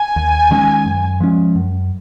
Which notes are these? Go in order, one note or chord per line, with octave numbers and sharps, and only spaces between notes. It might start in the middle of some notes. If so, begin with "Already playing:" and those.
Already playing: G#5
D#2
D#3 G#3 C#4
F#2
F3 G#3 C#4
F#2